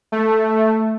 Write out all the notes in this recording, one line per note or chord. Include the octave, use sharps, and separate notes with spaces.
A3